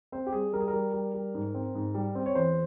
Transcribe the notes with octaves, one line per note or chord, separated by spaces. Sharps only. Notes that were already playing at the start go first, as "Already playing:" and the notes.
C4 C5
G4
G3 G#4
G3 A#4
G#4
A#4
G3
G3
G3
G#2
C4
G#2
G3
C4
C#5
E2 C5